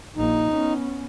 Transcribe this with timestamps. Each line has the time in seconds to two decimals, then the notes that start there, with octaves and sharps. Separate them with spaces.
0.16 A#1 A#3 D#4
0.51 B3 C#4